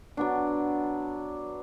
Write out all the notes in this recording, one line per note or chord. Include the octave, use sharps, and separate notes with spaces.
F#3 B3 D4